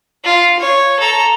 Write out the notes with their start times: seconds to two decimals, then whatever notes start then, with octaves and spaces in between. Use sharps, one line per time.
0.24 F4
0.59 C#5
1.00 A4 A#5